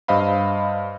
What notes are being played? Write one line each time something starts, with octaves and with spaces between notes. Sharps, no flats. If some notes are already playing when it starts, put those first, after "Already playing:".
G2 C5 D#5 F5 B5